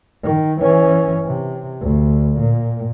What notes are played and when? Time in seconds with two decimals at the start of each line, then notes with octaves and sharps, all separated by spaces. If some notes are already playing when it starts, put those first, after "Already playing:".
0.23 D#3
0.61 E3 C#4
1.26 C3
1.81 D2
2.39 A#2